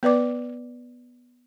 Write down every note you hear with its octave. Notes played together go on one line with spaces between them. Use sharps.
B3 B4 D5 D6